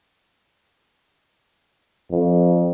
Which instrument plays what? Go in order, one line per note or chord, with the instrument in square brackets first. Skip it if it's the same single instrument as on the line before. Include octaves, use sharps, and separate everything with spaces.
[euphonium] F2